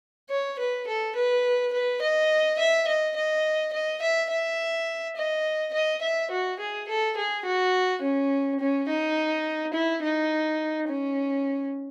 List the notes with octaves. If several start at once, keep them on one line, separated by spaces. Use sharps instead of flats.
C#5
B4
A4
B4
B4
D#5
E5
D#5
D#5
D#5
E5
E5
D#5
D#5
E5
F#4
G#4
A4
G#4
F#4
C#4
C#4
D#4
E4
D#4
C#4